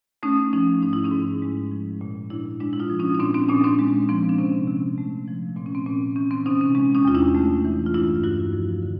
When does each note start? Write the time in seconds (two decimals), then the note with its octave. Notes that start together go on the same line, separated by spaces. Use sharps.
0.23 A3 C#4 D#4
0.53 F3 C#4 D#4
0.82 G#2 D#4
0.93 E4
1.04 C#4 D#4
1.12 G#2
1.42 G#3
1.71 F3
2.01 A#2
2.30 A#2 D4 E4
2.60 G#3 D4 E4
2.73 E4
2.80 D#4 F4
2.90 F3
2.99 C#4 D#4
3.15 D#4
3.19 A#2 C4 D4
3.34 C4 D4
3.49 A#2 C#4 D#4
3.64 C4 D4
3.79 G#3
4.09 F3 C4
4.29 D4
4.38 C3 C#4
4.67 C3
4.98 A3
5.28 F3
5.56 A#2 C4
5.66 C#4
5.75 C4
5.86 A#2 C#4
6.16 E3 C#4
6.31 C4
6.46 C3 C#4 D#4
6.61 C#4
6.75 G#3 C#4
6.95 C#4 D#4
7.05 E2 F4
7.15 D4 E4
7.35 A3
7.64 E3
7.86 F4
7.94 G2 D4 E4
8.23 G2 E4 F#4
8.53 F3
8.82 D3